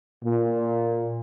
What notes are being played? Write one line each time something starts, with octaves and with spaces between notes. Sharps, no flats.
A#2